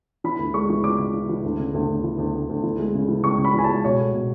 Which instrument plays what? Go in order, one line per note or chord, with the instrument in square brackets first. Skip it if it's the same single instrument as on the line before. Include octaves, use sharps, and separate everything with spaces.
[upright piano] E3 B5
D2
G#3 C#6
E3
C#3 D6
C#3
E3
E3
D2
C#3
D2
D2
E3
D2
D2
D2
E3
G#3
C#3
E3
C#2 C#6
C#3
B5
E3 G#5
G#3 A5
B2 C#5
A3
B2